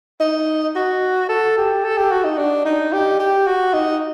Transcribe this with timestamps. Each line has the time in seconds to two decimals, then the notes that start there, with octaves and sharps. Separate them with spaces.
0.20 D#4
0.75 F#4
1.29 A4
1.57 G4
1.84 A4
1.97 G4
2.11 F#4
2.24 D#4
2.38 D4
2.65 D#4
2.93 G4
3.19 G4
3.47 F#4
3.73 D#4